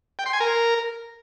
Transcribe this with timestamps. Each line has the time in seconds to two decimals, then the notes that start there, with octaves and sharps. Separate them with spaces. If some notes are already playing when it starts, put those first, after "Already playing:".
0.19 G5
0.26 C6
0.33 G#5
0.40 A#4